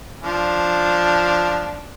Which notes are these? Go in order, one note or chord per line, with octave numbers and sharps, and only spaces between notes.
F3 D4